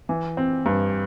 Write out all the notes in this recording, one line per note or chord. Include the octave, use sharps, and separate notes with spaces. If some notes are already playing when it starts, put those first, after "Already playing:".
E3
C4
G2